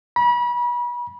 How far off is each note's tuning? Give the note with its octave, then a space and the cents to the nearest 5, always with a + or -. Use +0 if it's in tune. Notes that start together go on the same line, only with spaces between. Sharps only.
B5 -35